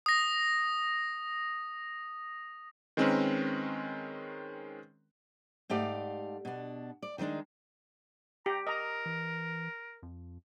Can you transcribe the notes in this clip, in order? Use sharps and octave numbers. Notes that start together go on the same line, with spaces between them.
D#6 A#6
D#3 G#3 C4 C#4 A#4 B4
G#2 A3 G4 D5 F5
B2 D4
D5
D#3 G3 G#3 D4 D#4
G4 A#5
A#4 D#5 A#5
E3
F2